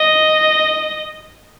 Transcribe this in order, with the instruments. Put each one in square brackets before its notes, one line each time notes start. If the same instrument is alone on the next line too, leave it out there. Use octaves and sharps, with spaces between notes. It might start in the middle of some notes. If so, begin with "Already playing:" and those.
Already playing: [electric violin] D#5